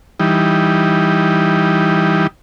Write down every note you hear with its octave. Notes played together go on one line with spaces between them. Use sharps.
E3 G3 D#4